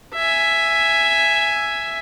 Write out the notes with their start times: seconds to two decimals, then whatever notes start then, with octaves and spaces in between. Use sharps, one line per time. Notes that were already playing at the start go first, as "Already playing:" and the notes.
0.14 E5 G#5